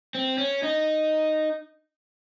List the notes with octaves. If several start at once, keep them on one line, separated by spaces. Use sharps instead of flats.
C4
C#4
D#4